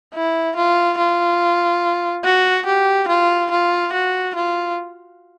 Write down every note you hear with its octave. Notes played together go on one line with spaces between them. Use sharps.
E4
F4
F4
F#4
G4
F4
F4
F#4
F4